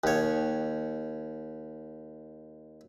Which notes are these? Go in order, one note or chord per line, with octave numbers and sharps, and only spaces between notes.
D#2 C#5